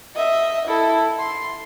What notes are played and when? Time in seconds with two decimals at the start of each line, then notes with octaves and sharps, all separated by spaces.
0.16 D#5 E5
0.68 E4 A4
1.19 C6